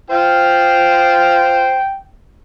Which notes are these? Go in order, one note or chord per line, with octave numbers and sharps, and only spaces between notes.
F4 C5 G5